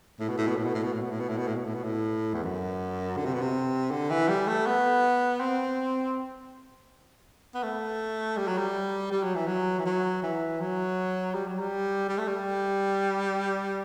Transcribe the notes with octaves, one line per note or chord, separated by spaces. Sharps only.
A2
B2
A2
B2
A2
B2
A2
B2
A2
B2
A2
B2
A2
B2
A2
B2
A2
B2
A2
E2
F#2
D3
C3
B2
C3
D3
E3
G3
A3
B3
C4
B3
A3
G3
F#3
G3
G3
F#3
E3
F#3
E3
F#3
E3
F#3
G3
F#3
G3
G3
A3
G3